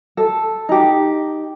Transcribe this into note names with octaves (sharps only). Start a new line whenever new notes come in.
A4
D#4 G4